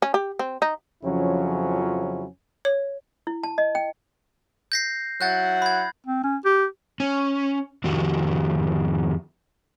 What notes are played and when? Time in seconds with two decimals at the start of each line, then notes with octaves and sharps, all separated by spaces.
0.02 C#4
0.14 G4
0.39 C4
0.62 D#4
1.04 F2 C#3 F3 F#3 C#4 E4
2.65 C#5
3.27 E4
3.43 A5
3.58 D#5
3.75 G5
4.72 G6 A#6 C7
5.21 F#3 E4 F#5 F#6 G6 A6
5.62 B5 G#6
6.07 C4
6.23 C#4
6.45 G4
7.00 C#4
7.84 F2 D#3 F#4 G4